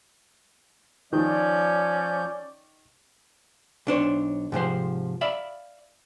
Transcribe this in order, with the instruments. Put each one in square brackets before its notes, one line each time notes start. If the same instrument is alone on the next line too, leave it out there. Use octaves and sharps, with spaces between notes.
[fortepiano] D#3 [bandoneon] F3 G6 [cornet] C#4 [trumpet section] D5
[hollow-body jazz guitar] B1 D4 C5 C#5
G#2 C3 F3 C5
D5 E5 F5 B5